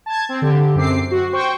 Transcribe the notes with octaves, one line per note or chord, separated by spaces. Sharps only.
A5 G#6
C4
D3 G4
F#2 C4 D6 C7
F#4
C5 G5 C6 C#6